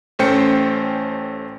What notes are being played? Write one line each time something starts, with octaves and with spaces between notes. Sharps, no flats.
A1 A3 C#4 C5 G5 C#7